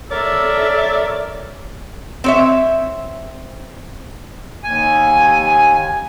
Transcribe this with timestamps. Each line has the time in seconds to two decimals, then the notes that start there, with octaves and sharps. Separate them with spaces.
0.11 A4 A#4 C#5 D5 E5
2.24 C4 C#5 E5
4.64 D#2 G#5